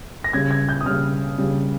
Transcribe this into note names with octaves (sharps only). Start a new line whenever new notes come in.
A#6
C#3 G3 G#6
G#6
G6
D#6
C#3 G3 F6
C#3 G3